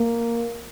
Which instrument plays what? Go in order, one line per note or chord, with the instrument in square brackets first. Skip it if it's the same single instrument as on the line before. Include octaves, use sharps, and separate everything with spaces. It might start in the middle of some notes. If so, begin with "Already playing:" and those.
Already playing: [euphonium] A#3